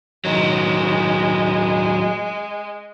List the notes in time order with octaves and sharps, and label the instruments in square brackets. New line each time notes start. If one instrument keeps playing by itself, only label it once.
[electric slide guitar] A2 D#3 F#3 [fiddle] G#3